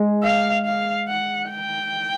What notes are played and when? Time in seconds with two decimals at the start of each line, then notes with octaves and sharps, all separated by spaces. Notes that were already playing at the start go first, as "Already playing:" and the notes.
Already playing: G#3
0.23 F5
0.66 F5
1.08 F#5
1.50 G5